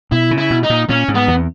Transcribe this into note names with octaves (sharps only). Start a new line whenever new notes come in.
B2 E4
C#3
E4
B2
D#4
A#2
A#2 C#4
G#2
B3
E2